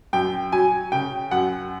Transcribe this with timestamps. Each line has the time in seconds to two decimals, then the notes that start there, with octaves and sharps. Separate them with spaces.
0.13 F#2 G5
0.52 F#3 G#5
0.92 C#3 G5
1.31 F#2 F#5